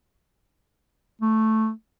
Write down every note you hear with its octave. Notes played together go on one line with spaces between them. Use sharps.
A3